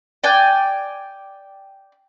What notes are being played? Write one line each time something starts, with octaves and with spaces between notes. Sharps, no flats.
D5 G5 G#5 F#6